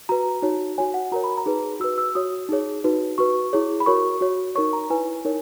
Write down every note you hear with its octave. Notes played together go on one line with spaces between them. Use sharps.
F#4 B4 A#5
D#4 F#4 C#5
F#4 C#5 G#5
F#5
F#4 A#4 C#5 A#5
B5
A#5
D#4 G#4 B4
F#4 B4 E6
E6
F#4 C#5 D#6
D#4 G#4 C#5
D#4 F#4 B4
F#4 B4 C#6
E4 G#4 C#5
B5
F#4 A#4 C#5 C#6
F#4 C#5
D#4 A#4 C#5 C#6
A#5
E4 B4 G#5
D#4 A#4 C#5